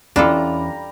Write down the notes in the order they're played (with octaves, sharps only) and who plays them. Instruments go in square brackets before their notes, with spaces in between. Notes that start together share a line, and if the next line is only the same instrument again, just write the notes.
[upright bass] E2 [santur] G3 A#5 [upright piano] C#4 E4 [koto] D4 F4 A4